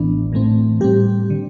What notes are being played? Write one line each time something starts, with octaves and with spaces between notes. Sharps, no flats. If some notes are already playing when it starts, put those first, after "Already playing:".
Already playing: A1 A2 E3 B3 D4
A2 E3 A3 C4
A2 G3 C4 G4
D3